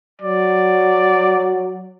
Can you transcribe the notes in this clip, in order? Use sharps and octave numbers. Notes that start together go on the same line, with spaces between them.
F#3 D5